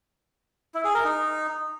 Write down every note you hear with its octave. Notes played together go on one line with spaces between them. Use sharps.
E4
G#4
A#4
D#4